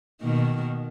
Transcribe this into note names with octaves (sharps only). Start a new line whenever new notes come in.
B2 D#3 A#3